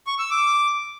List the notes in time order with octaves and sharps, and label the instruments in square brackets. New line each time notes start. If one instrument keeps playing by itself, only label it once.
[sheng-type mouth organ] C#6
E6
D6